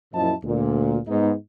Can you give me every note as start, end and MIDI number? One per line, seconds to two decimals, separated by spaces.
0.14 0.32 42
0.14 0.32 46
0.14 0.32 53
0.14 0.32 64
0.14 0.32 75
0.14 0.32 81
0.44 0.97 38
0.44 0.97 46
1.08 1.32 44
1.08 1.32 59
1.08 1.32 63